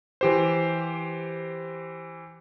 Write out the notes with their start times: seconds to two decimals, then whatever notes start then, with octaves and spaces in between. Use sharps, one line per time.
0.21 E3 G4 C5